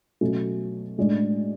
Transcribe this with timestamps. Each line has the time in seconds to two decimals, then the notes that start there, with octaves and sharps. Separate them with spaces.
0.21 B2 F#3 A3 C#4
0.98 A2 G#3 D4